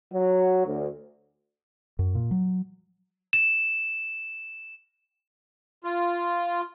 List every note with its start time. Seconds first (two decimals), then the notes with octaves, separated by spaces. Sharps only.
0.13 F#3
0.67 D2
1.99 F#2
2.15 A#2
2.31 F#3
3.33 E7
5.84 F4